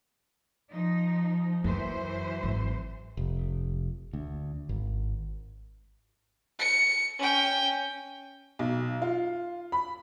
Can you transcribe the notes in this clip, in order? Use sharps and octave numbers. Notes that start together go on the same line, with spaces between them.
F3 D#4
F#2 E3 F#3 C5
G#1
F1
D2
G#1
C#7
C#4 G5
B1
F4
B5